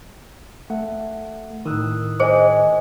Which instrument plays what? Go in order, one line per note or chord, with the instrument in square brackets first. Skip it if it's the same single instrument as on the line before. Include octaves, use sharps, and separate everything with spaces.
[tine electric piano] A3 F#5
[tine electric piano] A2 D#3 [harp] D#6 E6 F#6
[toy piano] G#4 C5 [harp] D#5 G5 G#5